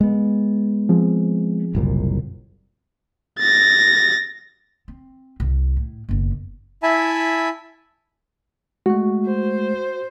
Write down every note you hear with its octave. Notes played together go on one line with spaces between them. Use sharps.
G#3 B3
F3 C4 G#4
F#1 C2 A#2
A6 A#6
C4
C2
A2
F#1 B2
E4 E5 G#5 A5 B5
G#3 A3 F#4
C5